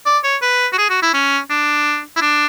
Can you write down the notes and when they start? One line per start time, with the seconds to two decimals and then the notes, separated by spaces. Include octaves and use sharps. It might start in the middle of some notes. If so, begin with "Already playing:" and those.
0.05 D5
0.24 C#5
0.42 B4
0.72 F#4
0.78 G#4
0.89 F#4
1.02 E4
1.13 C#4
1.50 D4
2.16 E4
2.21 D4